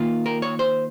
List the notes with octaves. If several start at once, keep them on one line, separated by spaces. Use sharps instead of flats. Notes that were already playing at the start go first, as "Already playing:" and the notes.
Already playing: D#3 A#3 F4
A#4
C#5
C5